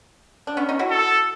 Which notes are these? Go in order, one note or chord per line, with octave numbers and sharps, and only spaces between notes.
D4
B3 C#4
C#4 D#4
E4 F#4
A4